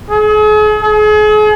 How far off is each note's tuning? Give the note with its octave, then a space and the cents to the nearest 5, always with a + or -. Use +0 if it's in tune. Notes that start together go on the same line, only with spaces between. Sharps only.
G#4 +40
G#4 +40